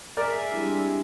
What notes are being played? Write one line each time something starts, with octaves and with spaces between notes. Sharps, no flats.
G#4 A#4 D5 E5
G3 G#3 C4 D4 E4